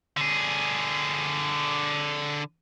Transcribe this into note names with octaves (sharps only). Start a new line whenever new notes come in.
D3 G#4